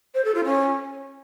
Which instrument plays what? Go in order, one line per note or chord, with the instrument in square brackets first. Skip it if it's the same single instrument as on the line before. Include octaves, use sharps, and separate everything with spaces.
[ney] C5
A4
F4
C#4